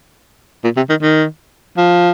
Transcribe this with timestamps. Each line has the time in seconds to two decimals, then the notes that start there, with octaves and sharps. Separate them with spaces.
0.64 A#2
0.77 C3
0.89 D#3
1.02 D#3
1.77 F3